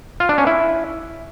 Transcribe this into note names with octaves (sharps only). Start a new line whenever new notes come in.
F4
D4
C#4
E4